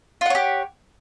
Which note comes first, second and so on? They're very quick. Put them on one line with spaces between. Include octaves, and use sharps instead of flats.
F4 F#5 C#5 G4